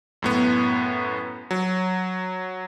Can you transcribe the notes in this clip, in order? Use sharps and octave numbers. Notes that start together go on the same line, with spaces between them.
F#2 A2 B3
F#3